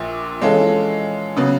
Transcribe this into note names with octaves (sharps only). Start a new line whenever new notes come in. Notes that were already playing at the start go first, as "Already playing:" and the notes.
Already playing: A#1 A#2
E3 G#3 C#4 F4 A4
C#3 F#3 B3